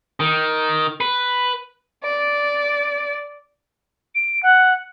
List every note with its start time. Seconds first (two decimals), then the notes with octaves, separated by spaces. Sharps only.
0.20 D#3
1.01 B4
2.04 D5
4.15 D7
4.43 F#5